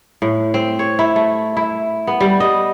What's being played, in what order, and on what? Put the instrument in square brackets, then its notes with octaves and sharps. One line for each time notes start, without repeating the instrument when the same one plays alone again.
[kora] A2
C4
C#5
E4
A3
E4
B3
G3
D#5